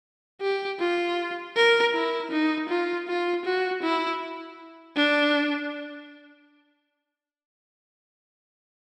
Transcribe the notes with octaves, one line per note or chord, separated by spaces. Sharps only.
G4
F4
A#4
E4
D#4
F4
F4
F#4
E4
D4